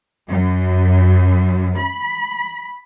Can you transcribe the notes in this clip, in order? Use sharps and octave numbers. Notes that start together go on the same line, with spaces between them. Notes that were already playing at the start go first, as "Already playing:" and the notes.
F#2
B5